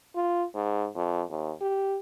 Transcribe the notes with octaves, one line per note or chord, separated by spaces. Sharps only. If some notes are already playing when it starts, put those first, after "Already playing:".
F4
G#2
F2
D#2
G4